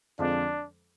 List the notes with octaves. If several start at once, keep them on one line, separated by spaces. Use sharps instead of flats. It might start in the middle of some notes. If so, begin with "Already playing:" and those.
F2 D3 F3 G#3 C4 D4